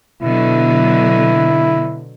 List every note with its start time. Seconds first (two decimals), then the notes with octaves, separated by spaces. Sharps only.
0.22 B2 D3 F#3 E4